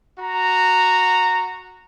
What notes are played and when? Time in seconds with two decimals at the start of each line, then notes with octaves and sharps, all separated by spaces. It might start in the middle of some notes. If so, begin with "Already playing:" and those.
0.19 F#4 A#5